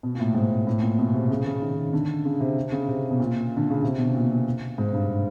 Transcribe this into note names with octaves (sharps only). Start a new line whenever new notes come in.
B2
A#2
A2
G#2
A2
A#2
B2
C3
C#3
C#3
D#3
D3
C#3
C3
C#3
C3
B2
A#2
D3
C#3
C3
B2
A#2
G#2
G2